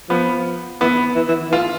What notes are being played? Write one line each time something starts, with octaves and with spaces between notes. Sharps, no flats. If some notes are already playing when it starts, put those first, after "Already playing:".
F3 B3
E3 B3
E3
E3
E3 F4